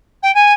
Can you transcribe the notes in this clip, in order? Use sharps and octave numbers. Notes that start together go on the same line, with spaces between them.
G5
G#5